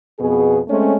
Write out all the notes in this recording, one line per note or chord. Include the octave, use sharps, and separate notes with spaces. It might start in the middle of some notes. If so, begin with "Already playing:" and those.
F2 B2 B3 G#4
G#3 A3 C4 C#4